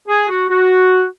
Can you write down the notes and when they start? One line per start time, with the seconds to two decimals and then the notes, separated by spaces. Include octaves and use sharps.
0.08 G#4
0.29 F#4
0.49 F#4